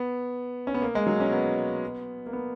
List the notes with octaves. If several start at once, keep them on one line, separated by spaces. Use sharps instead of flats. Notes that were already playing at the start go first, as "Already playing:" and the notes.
Already playing: B3
C#4
B3
A#3
G#3
F#3
C#4
B3
A#3
B3